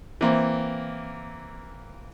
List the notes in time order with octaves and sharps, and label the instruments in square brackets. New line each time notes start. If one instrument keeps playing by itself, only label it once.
[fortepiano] E3 A#3 C4